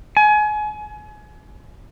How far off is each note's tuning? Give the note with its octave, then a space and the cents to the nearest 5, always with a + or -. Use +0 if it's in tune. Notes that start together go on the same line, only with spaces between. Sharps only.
G#5 +30